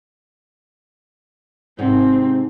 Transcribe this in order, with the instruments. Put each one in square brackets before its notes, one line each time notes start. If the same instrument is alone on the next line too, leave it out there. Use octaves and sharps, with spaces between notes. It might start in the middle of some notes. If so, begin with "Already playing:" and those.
[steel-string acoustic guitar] G#2 C3 [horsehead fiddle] C4